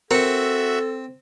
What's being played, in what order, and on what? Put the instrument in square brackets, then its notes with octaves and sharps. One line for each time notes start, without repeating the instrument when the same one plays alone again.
[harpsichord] C4 [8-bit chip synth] F#4 E5 [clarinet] A4 [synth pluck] A#4 C#7